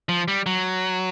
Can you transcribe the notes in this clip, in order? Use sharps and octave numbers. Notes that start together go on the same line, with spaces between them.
F3
G3
F#3